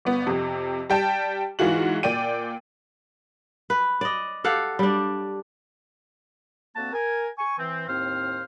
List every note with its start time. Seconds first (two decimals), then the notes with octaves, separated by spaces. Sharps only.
0.05 G1 B3
0.27 F2 C3
0.90 G3 G5 A5
1.59 G#2 E3 F4 F#4 F#7
2.03 A#2 D5 G5 D#7
3.70 B4
4.01 D5 D#5
4.44 G4 A4 F5 F#5
4.79 G3 D4
6.76 D2 A#3 C4 F#4 A5
6.93 A#4 G#5
7.38 G#5 C#6
7.58 E3 C4
7.88 D#2 A2 C4 C5 F5 F6